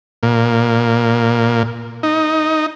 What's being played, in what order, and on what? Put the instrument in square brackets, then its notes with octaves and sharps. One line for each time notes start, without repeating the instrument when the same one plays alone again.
[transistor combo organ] A#2
D#4